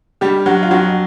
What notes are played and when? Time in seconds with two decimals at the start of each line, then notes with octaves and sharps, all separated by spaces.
0.21 G2 G3 G4
0.46 G2 F#3 F#4
0.63 F4
0.71 F2 F#3 F#4